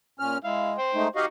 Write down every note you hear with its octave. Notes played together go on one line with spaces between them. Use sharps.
A#2 C#4 F6
G#3 E4 F5
C5 G5
G#3 A3 D#4
D#4 F#4 G4 D#5 F5 C#6